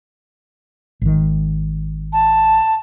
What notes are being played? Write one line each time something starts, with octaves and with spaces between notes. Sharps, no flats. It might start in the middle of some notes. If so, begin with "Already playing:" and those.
G#1 D#3
A5